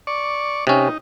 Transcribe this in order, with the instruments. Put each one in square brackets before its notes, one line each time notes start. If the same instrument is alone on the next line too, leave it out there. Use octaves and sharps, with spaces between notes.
[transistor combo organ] D5 C#6
[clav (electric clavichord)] C3 C#4 [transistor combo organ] D#4